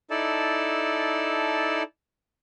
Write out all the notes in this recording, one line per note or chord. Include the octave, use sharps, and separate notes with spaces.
D#4 E4 A4 D5 A5